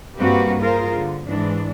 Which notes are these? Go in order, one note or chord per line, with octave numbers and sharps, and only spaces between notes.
G2 A#3 C4 F#4 G4 B4
F4 G#4 A#4 C5
D3
G#2 E3 G#3 D4